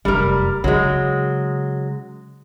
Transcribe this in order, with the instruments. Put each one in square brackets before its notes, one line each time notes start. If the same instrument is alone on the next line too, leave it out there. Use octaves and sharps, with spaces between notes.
[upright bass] F1 F#2 [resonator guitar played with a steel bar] G3 A#4
[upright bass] C#3 [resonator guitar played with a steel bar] F#3 G#3